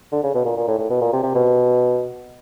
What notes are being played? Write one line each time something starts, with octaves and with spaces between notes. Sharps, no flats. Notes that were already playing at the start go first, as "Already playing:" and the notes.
D3
C#3
B2
A#2
A#2
A2
A2
B2
A#2
C3
C3
B2